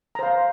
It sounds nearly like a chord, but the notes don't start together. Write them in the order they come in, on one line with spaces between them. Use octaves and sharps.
A#5 C5 F5